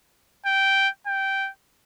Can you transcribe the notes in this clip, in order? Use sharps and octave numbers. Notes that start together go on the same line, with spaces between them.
G5
G5